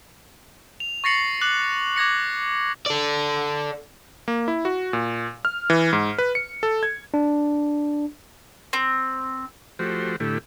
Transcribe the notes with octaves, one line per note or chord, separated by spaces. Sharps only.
F7
C#6 A6 A#6 C7 C#7 F#7
D6 F#6 F#7
D6 G#6 A#6 C#7
A4 D5
A#3
E4
F#4
A#2
F6
E3
G#2
B4
C#7
A4
G#6
D4
C4
F3 A3 F#4 G4 C5
A2 D3 A3 E4 G4